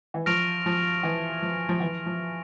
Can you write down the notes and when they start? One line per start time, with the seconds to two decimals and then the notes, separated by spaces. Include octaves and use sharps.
0.14 E3
0.26 F3 C#6 F6 A#6 D7 F7
0.66 F3
1.03 E3
1.42 F3
1.69 F3
1.80 E3
2.06 F3